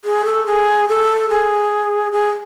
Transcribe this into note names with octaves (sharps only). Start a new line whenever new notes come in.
G#4
A4
G#4
A4
G#4
G#4